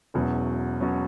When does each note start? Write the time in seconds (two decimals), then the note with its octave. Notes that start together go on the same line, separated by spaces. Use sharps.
0.14 E1 E2 B2 F#3 C#4
0.80 B2 F#3 C#4